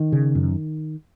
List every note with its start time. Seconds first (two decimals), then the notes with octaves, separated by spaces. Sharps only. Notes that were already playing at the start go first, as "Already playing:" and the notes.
Already playing: D#3
0.12 C#3
0.35 F#2